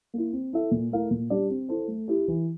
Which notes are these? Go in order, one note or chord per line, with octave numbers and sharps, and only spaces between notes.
A#3 E4
C4
E4 A4 E5
A#2
A3 E4 A#4 F5
A#2
G3 D4 G4 D5
C4
E4 A4 C5
A3
E4 G4
E3